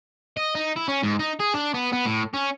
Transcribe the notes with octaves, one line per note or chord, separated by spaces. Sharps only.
D#5
D#4
E4
C#4
G#2
D#4
G#4
D4
B3
B3
A2
C#4